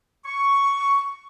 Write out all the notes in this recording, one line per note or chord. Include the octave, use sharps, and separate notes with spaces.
C#6